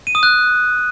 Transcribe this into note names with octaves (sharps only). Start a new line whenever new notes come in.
D#7
D#6
F#6